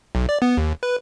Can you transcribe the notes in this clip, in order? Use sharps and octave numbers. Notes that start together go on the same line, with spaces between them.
B1
D5
B3
D#2
B4